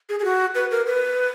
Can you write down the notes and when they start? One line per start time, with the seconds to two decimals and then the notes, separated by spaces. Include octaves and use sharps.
0.09 G#4
0.19 G#4
0.24 F#4
0.55 B4
0.71 A#4
0.86 B4